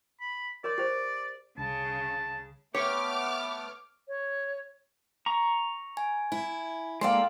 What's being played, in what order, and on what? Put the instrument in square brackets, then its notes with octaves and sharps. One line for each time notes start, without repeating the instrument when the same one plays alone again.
[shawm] B5
[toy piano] A#4 C#5 C6 [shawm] D5
[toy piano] G4 C5
[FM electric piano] C2 [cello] C#3 [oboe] A5
[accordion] A3 B3 [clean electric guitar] G4 [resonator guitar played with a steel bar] C#5 [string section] D6 F6
[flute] C#5
[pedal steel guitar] A#5 C#6
[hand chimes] G#5
[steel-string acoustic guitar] E4
[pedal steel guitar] G#3 A#3 [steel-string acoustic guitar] A4 D5 G5 [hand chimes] F5 C6